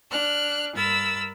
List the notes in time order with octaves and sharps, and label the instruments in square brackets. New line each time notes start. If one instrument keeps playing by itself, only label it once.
[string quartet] D4 F6 F#6
G2 A#4 B5 E6 A6